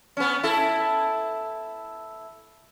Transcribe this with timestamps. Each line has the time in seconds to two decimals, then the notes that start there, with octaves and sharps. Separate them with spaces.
0.17 B3 C#4
0.43 E4 A4